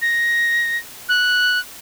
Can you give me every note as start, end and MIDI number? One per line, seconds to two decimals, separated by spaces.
0.02 0.77 94
1.09 1.59 90